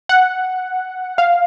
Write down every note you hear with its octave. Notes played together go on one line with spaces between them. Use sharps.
F#5
F5